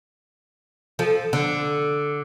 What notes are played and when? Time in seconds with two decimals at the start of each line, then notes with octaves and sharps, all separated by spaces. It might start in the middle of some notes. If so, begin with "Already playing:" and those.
0.99 F3 A4
1.33 D3